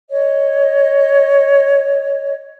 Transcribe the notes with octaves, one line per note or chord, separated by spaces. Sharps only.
C#5 D#5